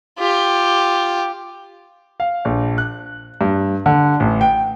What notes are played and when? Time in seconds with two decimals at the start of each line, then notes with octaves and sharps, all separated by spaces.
0.19 F4 G4
2.20 F5
2.45 A#1
2.78 F#6
3.41 G2
3.86 D3
4.20 A1
4.41 G5